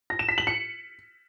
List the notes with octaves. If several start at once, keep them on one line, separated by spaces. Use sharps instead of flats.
A#6
E7
B6
F#7
C#7